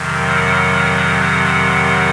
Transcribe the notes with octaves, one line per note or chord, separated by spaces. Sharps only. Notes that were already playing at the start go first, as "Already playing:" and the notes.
Already playing: F2 C3 D#3 F#3
F#5